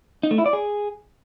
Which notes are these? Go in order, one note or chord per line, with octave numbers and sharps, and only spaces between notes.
D#4
A3
E4
D5
G#4